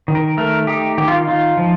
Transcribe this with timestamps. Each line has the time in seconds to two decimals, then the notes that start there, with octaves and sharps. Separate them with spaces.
0.08 D#3
0.15 A#4
0.37 A3 A#4
0.67 D#4 G4
0.98 D#3 G4
1.08 F4
1.28 D#4 F4
1.57 F3